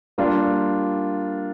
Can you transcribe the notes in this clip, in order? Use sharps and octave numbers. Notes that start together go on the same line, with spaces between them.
G3 A#3 D4 F4